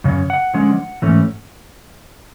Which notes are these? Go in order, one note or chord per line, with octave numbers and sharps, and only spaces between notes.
F#2 C#3 C#4
F#5
D3 F3 G#3 C#4
G#2 E3 A3 C#4